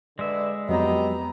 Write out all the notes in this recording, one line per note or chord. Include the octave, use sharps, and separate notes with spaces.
D3 G#3 B4 D5 E5
F2 F#3 B3 G4 D#5 A#5